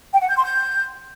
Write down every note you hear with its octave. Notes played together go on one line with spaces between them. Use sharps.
G5
F#5
G6
C6
G6